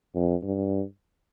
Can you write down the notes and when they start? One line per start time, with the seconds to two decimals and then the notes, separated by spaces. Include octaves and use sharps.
0.15 F2
0.43 G2